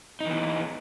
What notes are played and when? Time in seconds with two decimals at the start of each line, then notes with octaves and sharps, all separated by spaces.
0.20 D#4
0.25 E3
0.30 B3